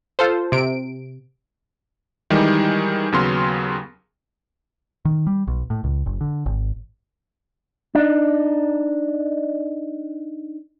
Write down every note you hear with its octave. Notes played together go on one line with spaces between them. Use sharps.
F4 A4 C5
C3 D7
D#3 E3 G3 G#3 D#4
D#2 C#3 F#3 B3 C6 F6
D#3
G3
B1
A2
C#2
F#1
D3
G#1
D4 D#4